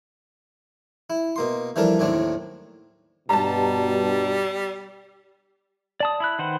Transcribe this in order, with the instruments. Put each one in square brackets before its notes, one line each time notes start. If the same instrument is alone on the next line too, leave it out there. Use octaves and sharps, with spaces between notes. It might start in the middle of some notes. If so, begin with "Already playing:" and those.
[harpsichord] E4
B2 A#3 C6
E3 F3 G3 D4 A4 A#4
D#2 A2 F#3 C4 D4
[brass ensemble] G2 B2 [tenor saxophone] G3 [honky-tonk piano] A5 A#5
[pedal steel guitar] D5 A5 D#6
E4 B5 F#6
D#3 B4 C5 F#5